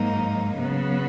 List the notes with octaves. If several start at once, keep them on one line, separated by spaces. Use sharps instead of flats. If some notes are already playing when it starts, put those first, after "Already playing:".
Already playing: G#2 F#3 A#3 D#4
C#3 F#3 B3